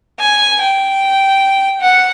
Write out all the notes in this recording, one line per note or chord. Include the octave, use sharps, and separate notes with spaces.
G#5
G5
F#5